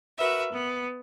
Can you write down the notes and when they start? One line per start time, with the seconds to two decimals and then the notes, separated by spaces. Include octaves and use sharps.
0.18 F#4 A#4 B4 E5
0.52 B3